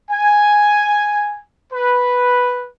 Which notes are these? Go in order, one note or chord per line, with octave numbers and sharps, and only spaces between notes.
G#5
B4